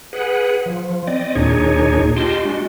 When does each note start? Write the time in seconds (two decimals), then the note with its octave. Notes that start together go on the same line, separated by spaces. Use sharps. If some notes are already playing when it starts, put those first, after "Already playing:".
0.13 G#4 B4 F#5
0.66 F3
1.07 C4 D5 D#5
1.36 D#2 A#2 D4 D#4 G#4 C#5
2.17 F4 G4 D#5 G5 A5 C6
2.45 G#3 D4 F#4